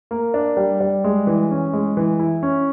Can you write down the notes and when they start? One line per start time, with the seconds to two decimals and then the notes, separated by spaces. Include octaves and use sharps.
0.11 A#3
0.34 D4
0.57 G3
0.80 G3
1.04 G#3
1.27 E3
1.51 C#4
1.73 G#3
1.97 E3
2.19 E4
2.43 C#4